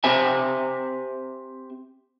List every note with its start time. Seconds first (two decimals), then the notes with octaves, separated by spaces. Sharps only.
0.04 C4 G4 C5 E5 G#5